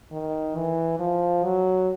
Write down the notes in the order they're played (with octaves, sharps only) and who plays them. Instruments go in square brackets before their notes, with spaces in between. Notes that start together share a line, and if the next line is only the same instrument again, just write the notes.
[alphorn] D#3
E3
F3
F#3